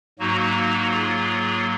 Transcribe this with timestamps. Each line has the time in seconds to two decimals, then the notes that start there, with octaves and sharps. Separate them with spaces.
0.19 G#2 F#3 A#3 D#4 F#4
0.91 F4 G#4